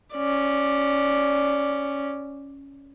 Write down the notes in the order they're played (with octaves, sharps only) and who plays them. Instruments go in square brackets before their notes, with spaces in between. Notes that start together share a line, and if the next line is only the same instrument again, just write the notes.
[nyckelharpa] C#4 D5